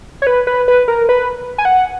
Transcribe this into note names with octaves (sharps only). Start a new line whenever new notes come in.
C#5
B4
B4
B4
A#4
B4
G#5
F#5